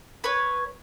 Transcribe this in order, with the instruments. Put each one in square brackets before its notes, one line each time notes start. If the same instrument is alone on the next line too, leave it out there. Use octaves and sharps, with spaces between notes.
[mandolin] B4 C#5